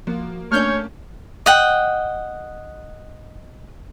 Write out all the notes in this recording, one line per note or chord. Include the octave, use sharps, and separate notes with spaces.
F3 A#3 F#4
A3 A#3 C#4 D4 C#5 F6 G6
D#5 F#5 G5